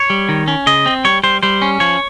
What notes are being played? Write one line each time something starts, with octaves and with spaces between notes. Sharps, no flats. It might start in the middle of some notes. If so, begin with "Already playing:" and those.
Already playing: C#5
G3
D#3
C#4
C#3 D#5
C4
G3 C#5
G3 C5
G3 C5
C#4
F3 C#5